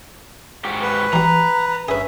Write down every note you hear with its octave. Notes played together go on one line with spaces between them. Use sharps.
G#2 F#4 G4
B4
E3 G3 A#5
G2 C#4 G#4 B4 E5